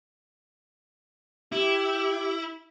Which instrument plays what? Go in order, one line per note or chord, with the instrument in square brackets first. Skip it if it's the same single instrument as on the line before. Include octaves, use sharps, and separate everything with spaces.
[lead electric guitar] E4 [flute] G4